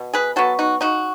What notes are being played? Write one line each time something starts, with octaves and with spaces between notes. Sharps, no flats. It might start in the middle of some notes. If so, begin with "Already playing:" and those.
Already playing: B2
G#4 B4
F#3 B3 F#4 A4
D#4 F#4
C#3 D#4 F#4